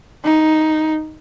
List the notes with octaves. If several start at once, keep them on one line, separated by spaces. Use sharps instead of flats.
D#4